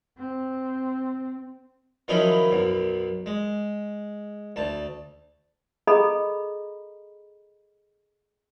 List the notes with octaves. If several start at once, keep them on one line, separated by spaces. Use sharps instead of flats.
C4
D#3 F3 F#3 C#4 D#4 E4
B1 F#2
G#3
D2 A5
G#4 A4 D#5 A#5 B5